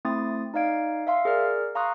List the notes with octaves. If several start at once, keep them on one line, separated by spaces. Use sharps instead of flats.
A3 C4 E4 C6 D#6 A6
D#4 D5 D#5 F5 G#6 D7
E5 F5 C6
G#4 A#4 D5 F6
F5 A#5 C6 C#6 D#6 F#6